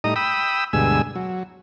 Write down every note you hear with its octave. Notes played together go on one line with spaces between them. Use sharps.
A2 G3 D#4 D#5 A#5 D#6
G5 B5 D#6 E6
D2 G2 B2 G#3 G#5 E6
F#3